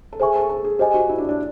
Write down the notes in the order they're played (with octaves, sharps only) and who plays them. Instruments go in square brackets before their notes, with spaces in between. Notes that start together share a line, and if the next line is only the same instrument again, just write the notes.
[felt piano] A4
[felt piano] G#4 [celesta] C5 E5 G#5 C#6
[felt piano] A4
A4
G#4
[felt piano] G4 [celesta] C5 D#5 G#5
[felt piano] F#4
E4
D4
D4